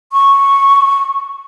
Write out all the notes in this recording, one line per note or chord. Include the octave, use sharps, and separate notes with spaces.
C#6